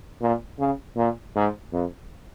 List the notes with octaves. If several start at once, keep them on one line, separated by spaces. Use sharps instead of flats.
A#2
C#3
A#2
G#2
F2